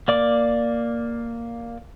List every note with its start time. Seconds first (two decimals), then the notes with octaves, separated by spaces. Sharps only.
0.08 A#3 D5 D6